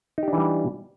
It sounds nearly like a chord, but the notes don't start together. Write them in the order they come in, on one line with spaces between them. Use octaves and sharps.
D#4 G4 D4 E3 G3